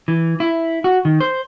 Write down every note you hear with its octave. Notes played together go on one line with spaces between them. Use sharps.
E3
E4
F#4
D#3
C5